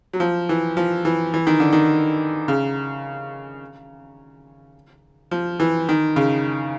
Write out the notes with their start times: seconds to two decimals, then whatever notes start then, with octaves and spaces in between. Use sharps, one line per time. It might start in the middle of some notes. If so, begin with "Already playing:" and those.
0.13 F#3
0.20 F3
0.49 E3
0.77 F3
1.05 E3
1.34 E3
1.47 D#3
1.60 D3
1.73 D#3
2.48 C#3
5.31 F3
5.60 E3
5.89 D#3
6.16 C#3